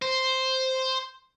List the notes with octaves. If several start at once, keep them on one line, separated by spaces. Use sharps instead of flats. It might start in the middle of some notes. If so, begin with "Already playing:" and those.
C5